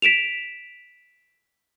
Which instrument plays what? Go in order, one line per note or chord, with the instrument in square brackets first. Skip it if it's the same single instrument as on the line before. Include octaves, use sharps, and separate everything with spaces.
[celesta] B6 D7 E7 F7